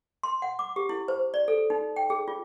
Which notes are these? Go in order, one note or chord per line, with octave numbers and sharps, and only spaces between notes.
C6
F#5
D6
G4
E4
C5
D5
A4
D#4
G5
G#4
F4